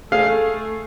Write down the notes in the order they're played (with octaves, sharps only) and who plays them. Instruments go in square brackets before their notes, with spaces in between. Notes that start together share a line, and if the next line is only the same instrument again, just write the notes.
[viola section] A3 [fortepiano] G#4 F5